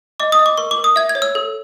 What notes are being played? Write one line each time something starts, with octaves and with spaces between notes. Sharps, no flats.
D#5 D6
D#6
D#5
D6
A#4 C#6
D6
A#4
D#6
E5 G#6
G#6
C#5
E6
A4